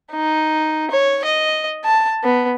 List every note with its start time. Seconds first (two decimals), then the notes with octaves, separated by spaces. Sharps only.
0.12 D#4
0.91 C#5
1.25 D#5
1.85 A5
2.23 B3